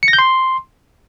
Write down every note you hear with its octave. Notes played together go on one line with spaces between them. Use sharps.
C#7
A#6
G6
C6